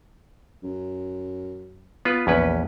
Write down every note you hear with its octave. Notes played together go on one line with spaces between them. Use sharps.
F#2
B3 F4 B4
A#1 E2 C#4 B4